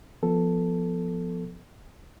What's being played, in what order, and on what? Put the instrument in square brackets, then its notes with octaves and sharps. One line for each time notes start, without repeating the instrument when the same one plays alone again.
[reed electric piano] F3 B3 A4